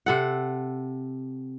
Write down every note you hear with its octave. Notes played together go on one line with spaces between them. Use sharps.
C3 A4 F#5